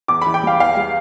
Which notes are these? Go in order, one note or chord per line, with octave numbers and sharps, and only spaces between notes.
E2 D6
B5
E3
G5
G3 F5
E2 F5
G3